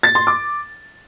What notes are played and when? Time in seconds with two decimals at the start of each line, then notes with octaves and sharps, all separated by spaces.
0.03 A6
0.15 C6
0.27 D6